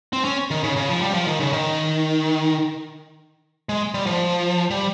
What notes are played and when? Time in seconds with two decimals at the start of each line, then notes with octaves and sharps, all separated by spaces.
0.13 C4
0.25 C#4
0.51 D#3
0.64 C#3
0.77 C#3
0.89 F3
1.02 G3
1.14 F3
1.27 D#3
1.40 C#3
1.53 D#3
3.69 G#3
3.94 G3
4.06 F3
4.71 G3